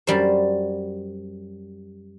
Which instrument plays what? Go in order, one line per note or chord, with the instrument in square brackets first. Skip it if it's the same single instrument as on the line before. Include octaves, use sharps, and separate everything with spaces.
[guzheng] F#2 G3 C5